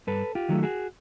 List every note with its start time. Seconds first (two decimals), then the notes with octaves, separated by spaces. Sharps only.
0.07 G2 A4 B4
0.35 F4 G4
0.49 D#3 F#3 A3
0.63 F#4 G#4